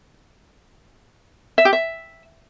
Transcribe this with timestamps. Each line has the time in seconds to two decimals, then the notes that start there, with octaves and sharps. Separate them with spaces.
1.58 E5
1.65 G4
1.73 E5